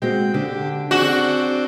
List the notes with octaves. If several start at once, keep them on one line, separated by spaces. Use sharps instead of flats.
G#3 C4 F#4 G5
D3 G4
C4 D4 F#4 G#4